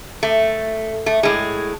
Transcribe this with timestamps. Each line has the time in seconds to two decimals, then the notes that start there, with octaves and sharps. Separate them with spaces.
0.23 A3
1.06 A3
1.23 A2 G#3